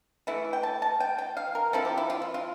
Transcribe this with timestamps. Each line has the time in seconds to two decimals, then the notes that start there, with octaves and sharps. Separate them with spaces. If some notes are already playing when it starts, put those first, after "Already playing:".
0.27 E3 A3 E4
0.53 G5
0.63 A5
0.82 A5
1.00 G5
1.18 G5
1.37 F5
1.55 A#4
1.73 F3 C4 E4 A4
1.85 G4
1.98 E4
2.10 F4
2.22 E4
2.34 F4